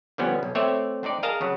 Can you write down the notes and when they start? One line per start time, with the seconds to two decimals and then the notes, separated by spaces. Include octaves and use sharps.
0.18 D3 F3 G3 B3 C#4
0.43 B1
0.55 A3 C4 C#5 D5 E5
1.03 C4 D4 D#4 D5
1.23 G#4 A#4 D#5 F5 A5 A#5
1.41 C#3 F#3